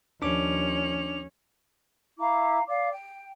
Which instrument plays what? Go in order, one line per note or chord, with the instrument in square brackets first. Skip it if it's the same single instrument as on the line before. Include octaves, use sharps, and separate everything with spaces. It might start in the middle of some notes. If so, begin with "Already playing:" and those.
[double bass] D#2 F3 [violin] C#4 F7 [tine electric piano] D4 D6
[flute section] E4 F5 A#5 D6
D5 F5 D6
G5